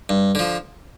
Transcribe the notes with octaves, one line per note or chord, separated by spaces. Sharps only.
G2
D3 F3